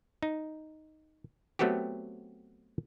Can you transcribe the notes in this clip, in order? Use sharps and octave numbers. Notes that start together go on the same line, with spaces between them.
D#4
F#3 A3 B3 C4 F#4 G4